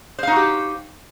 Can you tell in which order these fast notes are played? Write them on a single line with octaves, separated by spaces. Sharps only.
C5 F5 D#4 F#4 G4